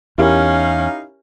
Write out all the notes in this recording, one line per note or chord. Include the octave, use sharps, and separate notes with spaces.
E2 C#4 D#4 E4 G4 A#4 F5